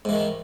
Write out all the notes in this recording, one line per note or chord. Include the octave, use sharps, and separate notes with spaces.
G#2 D#3 E3